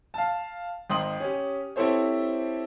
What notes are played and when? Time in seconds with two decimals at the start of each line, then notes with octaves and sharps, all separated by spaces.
0.14 F5 A5
0.90 G#1 D#4 G5 C6 D#6 F#7
1.20 C#4 G4
1.76 C4 E4 G4 A4 C5 C#5